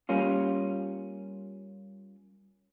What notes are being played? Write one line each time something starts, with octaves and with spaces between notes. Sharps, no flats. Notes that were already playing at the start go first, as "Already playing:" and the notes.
G3 A#3 C#4 F4